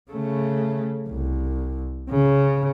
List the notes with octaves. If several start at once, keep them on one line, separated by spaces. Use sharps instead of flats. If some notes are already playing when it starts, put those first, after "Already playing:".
C#3 A3
C2
C#3